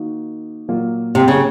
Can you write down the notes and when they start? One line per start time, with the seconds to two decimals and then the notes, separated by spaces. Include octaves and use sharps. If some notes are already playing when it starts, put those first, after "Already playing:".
Already playing: D#3 A#3 D#4 F#4
0.68 A#2 F#3 A#3 F4
1.15 C3
1.28 C#3